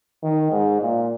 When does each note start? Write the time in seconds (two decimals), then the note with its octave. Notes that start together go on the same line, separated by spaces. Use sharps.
0.23 D#3
0.52 G#2
0.81 A#2